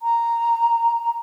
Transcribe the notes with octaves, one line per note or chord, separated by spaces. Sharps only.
A#5